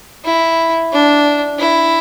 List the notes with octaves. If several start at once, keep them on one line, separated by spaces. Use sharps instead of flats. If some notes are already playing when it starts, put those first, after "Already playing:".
E4
D4
E4